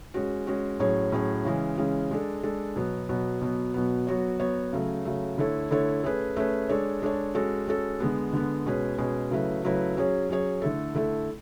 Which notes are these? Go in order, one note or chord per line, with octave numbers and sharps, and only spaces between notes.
G#3 C#4 F#4
G#3 C#4 F#4
A2 F#3 C#4 G#4 C#5
A2 F#3 C#4 G#4 C#5
C#3 E3 G#3 C#4
C#3 E3 G#3 C#4
G#3 D4 A4
G#3 D4 A4
B2 F#3 B3
B2 F#3 B3
B2 F#3 B3
B2 F#3 B3
F#3 B3 F#4 C#5
F#3 B3 F#4 C#5
C#3 F#3 A3
C#3 F#3 A3
D3 A3 E4 A4 C#5
D3 A3 E4 A4 C#5
A3 C#4 G#4 B4
A3 C#4 G#4 B4
G#3 D4 A4 C#5
G#3 D4 A4 C#5
G#3 C#4 F#4 A4
G#3 C#4 F#4 A4
D3 G#3 B3
D3 G#3 B3
B2 G#3 C#4 G#4 B4
B2 G#3 C#4 G#4 B4
C#3 F#3 A3 E4 B4
C#3 F#3 A3 E4 B4
F#3 C#4 G#4 C#5
F#3 C#4 G#4 C#5
D3 A3 E4 A4
D3 A3 E4 A4